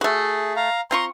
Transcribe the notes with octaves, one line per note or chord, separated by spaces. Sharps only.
A3 F#4 G#4
F5 A#5
C4 F4 A#5 C6 C#6